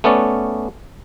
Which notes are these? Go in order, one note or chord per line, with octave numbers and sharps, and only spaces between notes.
A3 B3 C#4 D5